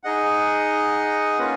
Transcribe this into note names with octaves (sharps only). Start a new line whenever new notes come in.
D#4 G#4 D#5 F#5
A#3 C#4 F4 B4